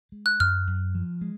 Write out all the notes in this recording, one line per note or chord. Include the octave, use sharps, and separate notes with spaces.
G#3
F#6
F#2 F6
F#2
F3
G#3